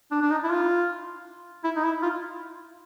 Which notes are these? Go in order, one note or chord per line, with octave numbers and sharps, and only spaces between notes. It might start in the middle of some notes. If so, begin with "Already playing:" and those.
D4
D4
D#4
E4
F4
E4
D#4
E4
F4